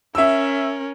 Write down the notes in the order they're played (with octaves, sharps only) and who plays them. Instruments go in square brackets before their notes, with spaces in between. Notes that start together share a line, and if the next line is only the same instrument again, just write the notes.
[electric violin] C#4 A#4 [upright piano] E5 E6